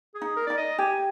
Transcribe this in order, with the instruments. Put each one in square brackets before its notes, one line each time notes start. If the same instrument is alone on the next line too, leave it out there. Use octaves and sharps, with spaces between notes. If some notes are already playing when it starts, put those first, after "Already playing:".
[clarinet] G#4
[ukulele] D#4
[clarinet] A#4
[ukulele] D#4 [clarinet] D5
[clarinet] D#5
[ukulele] G4 [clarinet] G#5